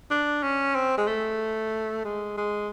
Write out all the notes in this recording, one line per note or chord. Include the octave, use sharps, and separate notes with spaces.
D4
C#4
C4
G#3
A3
G#3
G#3